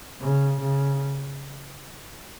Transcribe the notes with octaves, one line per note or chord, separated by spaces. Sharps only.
C#3
C#3